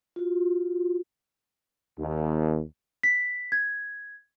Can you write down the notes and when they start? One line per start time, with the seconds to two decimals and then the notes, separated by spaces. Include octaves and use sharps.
0.16 F4 F#4
1.98 D#2
3.03 B6
3.52 G#6